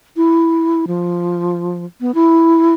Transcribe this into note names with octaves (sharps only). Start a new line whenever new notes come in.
E4
F3
B3
E4